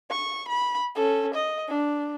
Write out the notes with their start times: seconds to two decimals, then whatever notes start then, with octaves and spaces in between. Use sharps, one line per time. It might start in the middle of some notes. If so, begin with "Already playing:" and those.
0.11 C#6
0.48 B5
0.95 C#4 A4
1.34 D#5
1.68 D4